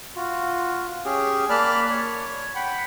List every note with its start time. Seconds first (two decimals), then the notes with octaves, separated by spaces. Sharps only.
0.16 F4 F#4
1.05 C#4 G4 G#4
1.50 A#3 D5 A5 B5 F6 F#6
1.90 C#5
2.55 F#5 G5 B5